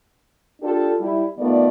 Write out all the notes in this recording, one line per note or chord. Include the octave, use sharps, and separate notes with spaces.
D4 F4 G4 A4
G3 E4
D#3 A3 B3 F4 D5